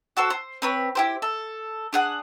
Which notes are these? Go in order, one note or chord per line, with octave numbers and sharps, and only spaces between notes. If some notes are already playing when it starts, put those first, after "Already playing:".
F#4 A4 C5
C5
C4 B4 C#5
E4 G4 C5
A4
D4 G#4 F#5